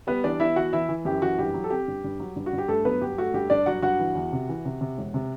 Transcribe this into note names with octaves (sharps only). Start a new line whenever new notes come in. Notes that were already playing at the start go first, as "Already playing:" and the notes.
G3 B3 B4
E3 D4 D5
B3 E4 E5
E3 F#4 F#5
E3 E4 E5
E3
F#2 G4
E3 F#4
G2 G4
F#3
A4
C4 G4
G2
G2
F#3
G2
F#4
G2
G4
G2 A3 A4
F#3 B3 B4
G2 G4
A3 F#4
G2 G4
G2 D4 D5
F#3 F#4 F#5
G2 F#4 F#5
E3
E2
C3
E3
C3
C3
E1
C3